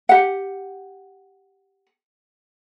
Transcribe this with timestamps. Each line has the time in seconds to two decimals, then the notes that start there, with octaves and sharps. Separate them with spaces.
0.09 G4 F#5